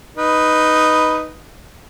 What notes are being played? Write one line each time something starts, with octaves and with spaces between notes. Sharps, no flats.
D#4 B4